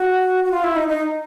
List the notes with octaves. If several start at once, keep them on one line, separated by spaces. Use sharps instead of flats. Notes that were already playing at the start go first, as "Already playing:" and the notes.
Already playing: F#4
F#4
F4
E4
D#4
D#4